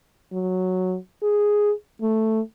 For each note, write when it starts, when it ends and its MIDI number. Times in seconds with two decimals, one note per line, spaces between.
0.32 0.96 54
1.23 1.71 68
2.02 2.40 57